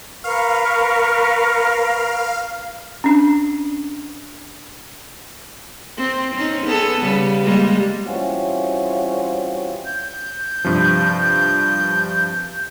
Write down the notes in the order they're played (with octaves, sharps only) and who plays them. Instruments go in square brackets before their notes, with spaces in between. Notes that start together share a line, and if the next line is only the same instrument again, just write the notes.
[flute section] A#4 B4 C#6 [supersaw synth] F5
[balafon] C#4 D4
[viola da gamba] C4
C4 C#4 D#4
B3 G#4 A4
C#3 G3 B3
G3 G#3 A#3
[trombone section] E3 G3 C4 C#4 F4 F#4
[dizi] G6
[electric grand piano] G2 C3 F3